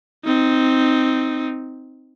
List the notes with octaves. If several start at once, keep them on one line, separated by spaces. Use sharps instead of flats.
C4 D#4